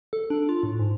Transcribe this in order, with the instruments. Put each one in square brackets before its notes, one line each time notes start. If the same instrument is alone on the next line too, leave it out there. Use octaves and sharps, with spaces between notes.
[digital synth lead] A4
D4
F4
A2
G#2